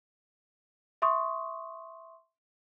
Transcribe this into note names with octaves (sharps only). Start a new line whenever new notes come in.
E5 C6 C#6 D#6